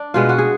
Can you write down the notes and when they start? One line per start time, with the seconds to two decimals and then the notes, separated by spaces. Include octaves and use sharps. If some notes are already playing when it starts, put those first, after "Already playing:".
Already playing: D4
0.14 B2 G#3 B3 F4
0.29 F#4
0.38 G#4